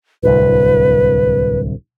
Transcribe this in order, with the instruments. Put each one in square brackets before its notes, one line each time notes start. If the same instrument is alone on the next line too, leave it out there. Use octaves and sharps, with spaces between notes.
[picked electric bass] D1 C2 [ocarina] B4